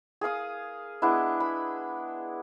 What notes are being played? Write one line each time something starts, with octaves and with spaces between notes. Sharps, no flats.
G#4 A#4 F5 D#6
G#3 B3 D4 E4
B5